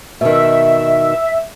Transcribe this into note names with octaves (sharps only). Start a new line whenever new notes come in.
B2 D#3 E5